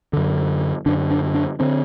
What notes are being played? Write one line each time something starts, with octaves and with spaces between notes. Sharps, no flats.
F#2 D3
F#2 D3 D4
D4
D4
D3 C4